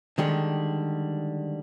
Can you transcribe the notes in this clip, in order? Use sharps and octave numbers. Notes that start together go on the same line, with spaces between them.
D3 D#3 G3 G#3